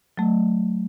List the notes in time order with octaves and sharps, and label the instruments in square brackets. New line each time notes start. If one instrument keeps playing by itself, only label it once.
[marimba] F#3 A3